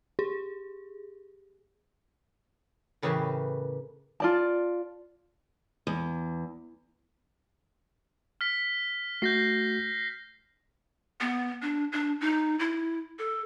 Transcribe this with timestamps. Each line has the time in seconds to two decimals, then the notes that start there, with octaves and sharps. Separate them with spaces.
0.19 G4 G#4
3.02 A2 C#3 E3 G4 A#4 B4
4.20 F4 D5 A5
5.87 E2
8.41 F6 B6
9.22 A3 F#4 G6 A#6 C7
11.21 B3
11.62 D4
11.92 D4
12.21 D#4
12.59 E4
13.19 A4